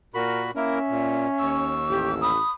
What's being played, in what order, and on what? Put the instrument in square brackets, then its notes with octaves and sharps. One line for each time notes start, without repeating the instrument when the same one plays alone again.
[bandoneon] A#2 F#4 B5 [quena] A#4
[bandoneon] A#3 E4 A#4 [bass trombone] C#4 [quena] E5
[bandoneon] A#2
[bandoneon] D#2 E6 [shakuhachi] C#6
[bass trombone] A1 [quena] G4
[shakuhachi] B5 [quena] D#6